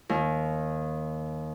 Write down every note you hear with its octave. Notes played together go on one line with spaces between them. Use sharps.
D#2